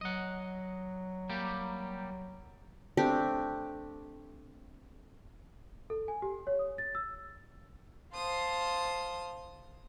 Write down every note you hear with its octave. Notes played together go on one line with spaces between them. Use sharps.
F#3 D#5 F#5
G3 A#3 G4
A3 C4 D4 G4
A4
G#5
G4
C#5
D#6
A6
E6
C5 F5 A5 C6 D#6